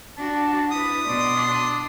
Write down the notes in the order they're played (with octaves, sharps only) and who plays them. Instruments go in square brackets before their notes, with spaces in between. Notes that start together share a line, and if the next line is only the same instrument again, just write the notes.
[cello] D4 F#4 [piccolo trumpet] A5
[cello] E4 B4 [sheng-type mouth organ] D#6
[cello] B2 [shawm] D5 [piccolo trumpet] C6
[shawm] D4